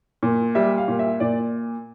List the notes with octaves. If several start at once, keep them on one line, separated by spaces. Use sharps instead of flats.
A#2
G3 E5
F5
A#2
E5
A#2 D5